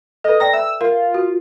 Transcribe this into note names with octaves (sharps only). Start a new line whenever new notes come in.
A4 B4 D#5
D5 G5 A#5 A#6
E5 E6
F4 A#4
F#4